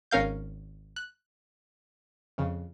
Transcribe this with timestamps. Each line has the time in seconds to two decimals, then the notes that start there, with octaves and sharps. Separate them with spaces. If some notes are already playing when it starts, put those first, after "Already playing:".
0.11 G#1 C#4 A#4 F5 G6
0.96 F#6
2.38 F2 C#3